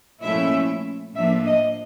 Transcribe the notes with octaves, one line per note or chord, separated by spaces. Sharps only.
A#2 F3 A3 C#4 E4 E5
A2 F3 A#3 D4 E5
D#5